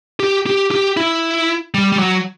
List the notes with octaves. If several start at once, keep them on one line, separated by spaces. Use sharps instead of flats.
G4
G4
G4
E4
G3
G3
F#3